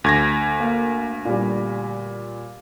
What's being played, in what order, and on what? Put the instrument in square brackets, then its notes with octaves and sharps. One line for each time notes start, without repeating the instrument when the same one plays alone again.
[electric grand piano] D2 G#6 A#6
[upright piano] A#3
A#2 G3